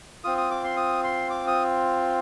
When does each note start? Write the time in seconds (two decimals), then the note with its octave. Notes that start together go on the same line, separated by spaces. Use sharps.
0.24 C4 F4 D#6
0.38 D#6
0.51 D6
0.64 C6
0.77 D#6
1.04 C6
1.30 D6
1.47 D#6